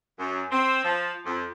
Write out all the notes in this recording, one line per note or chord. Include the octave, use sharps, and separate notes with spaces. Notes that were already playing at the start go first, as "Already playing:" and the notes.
F#2
C4
F3
F2